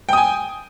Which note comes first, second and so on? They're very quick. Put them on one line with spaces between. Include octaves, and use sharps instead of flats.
G5 D#6 G#5